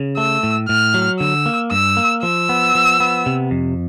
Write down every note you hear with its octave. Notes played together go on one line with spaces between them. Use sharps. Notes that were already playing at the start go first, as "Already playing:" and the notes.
Already playing: C#3
A3 E6
A2
A2 F6
F#3
D3 E6
A#3
G2 E6
A#3
F3 E6
B3
F3
B3
C3
F2